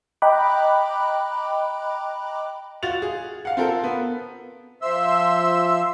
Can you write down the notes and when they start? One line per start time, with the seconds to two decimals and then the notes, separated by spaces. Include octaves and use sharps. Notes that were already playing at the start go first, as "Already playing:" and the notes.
0.22 D#5 G5 A#5 B5 D6 F#6
2.83 F4 F#4 A6 F7
3.02 G#4
3.45 F5 F#5
3.57 C4 F4 A4 A#4
3.84 B3
4.82 F3 E5 C6 E6